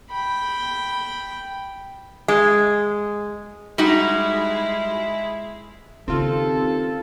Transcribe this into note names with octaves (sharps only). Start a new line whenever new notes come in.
G5 B5
G#3
G3 G#3 D#4 E4 F#4
D#2 C#3 C4 F4 A4